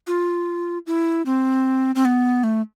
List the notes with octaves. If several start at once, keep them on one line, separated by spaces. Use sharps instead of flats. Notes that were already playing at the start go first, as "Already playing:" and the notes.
F4
E4
C4
C4
B3
A3